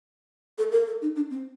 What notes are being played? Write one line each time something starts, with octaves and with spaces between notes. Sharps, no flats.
A4
A#4
A4
D#4
D4
C4